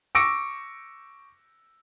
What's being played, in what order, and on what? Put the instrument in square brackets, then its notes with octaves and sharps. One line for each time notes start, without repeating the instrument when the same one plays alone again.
[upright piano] C#6 D6 E6 A#6 C#7 D7